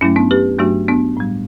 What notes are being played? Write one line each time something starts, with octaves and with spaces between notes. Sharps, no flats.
G2 F#3 A3 C#4 E4
B3 D4
G4 B4
G2 F#3 A3 D4 F#4
B3 D4
A2 G3